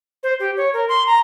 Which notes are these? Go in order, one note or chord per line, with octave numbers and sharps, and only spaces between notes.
C5
G4
C#5
A#4
C6
A#5